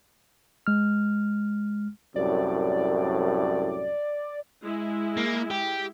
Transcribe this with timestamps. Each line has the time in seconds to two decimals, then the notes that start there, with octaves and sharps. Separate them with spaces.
0.67 G#3 F6
2.16 C2 F#2 A2 D5
4.63 G#3 E4
5.17 A#3
5.50 G4